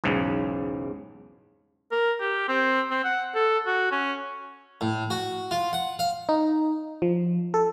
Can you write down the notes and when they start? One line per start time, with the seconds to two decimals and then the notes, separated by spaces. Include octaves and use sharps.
0.04 B1 E2 G#2 C#3
1.92 A#4
2.20 G4
2.48 C4
2.90 C4
3.04 F#5
3.35 A4
3.66 F#4
3.91 C#4
4.81 A2
5.10 F#4
5.51 F4
5.73 F#5
5.99 F5
6.29 D#4
7.02 F3
7.54 A4